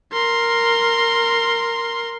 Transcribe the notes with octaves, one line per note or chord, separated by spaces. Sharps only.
A#4 C6